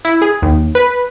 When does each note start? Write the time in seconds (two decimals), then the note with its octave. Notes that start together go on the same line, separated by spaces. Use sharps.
0.05 E4
0.22 G#4
0.42 D#2
0.75 B4